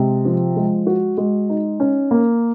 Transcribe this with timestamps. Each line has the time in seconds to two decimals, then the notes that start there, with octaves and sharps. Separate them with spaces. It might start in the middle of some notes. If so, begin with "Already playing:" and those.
Already playing: C3 G#3
0.25 F3
0.56 G#3
0.87 F#4
1.18 G#3
1.49 D#4
1.80 C#4
2.11 A#3